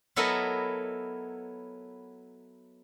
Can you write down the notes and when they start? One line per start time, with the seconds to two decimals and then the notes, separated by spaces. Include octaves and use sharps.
0.16 F#3 B3 E4 A4 A#4 D#5